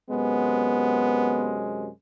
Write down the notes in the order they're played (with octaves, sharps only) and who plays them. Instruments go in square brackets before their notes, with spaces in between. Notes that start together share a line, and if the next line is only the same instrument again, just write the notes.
[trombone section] F#2 C3 G#3 [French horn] B3